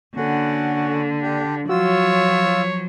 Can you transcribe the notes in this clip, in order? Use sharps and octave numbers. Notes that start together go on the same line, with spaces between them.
D3 A#3 C#4 F#4 A4 F#5
D4 G4
F3 F#3 F4 F#4 C#5 E6